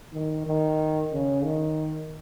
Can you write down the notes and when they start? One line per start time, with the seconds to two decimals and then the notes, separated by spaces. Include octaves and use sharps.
0.13 D#3
0.46 D#3
1.13 C#3
1.45 D#3